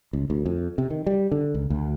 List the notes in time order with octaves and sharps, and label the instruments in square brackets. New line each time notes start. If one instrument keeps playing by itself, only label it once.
[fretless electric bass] C#2
D2
F2
C3
D#3
G3
D3
C#2
D2